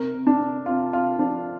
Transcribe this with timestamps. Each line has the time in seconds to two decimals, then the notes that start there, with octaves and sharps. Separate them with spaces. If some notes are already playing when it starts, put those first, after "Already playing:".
Already playing: C3 A#4
0.14 C3
0.27 D4
0.41 C3
0.66 C3 F4
0.93 C3 F4
1.19 F3 D4